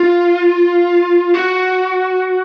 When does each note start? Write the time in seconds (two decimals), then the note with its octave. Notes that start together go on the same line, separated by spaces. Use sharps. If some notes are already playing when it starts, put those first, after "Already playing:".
Already playing: F4
1.34 F#4